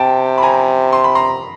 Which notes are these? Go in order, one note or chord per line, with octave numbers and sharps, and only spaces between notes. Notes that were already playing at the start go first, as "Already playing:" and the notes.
Already playing: C3 G5 A5
B5
G#5 A#5
C6
B5
A#5 C6